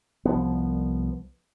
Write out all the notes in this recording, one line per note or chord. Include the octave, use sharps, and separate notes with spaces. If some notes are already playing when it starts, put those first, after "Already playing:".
C2 F3 B3